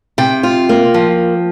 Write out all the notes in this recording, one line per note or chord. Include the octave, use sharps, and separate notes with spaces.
C3 G5
F4
A#3
F3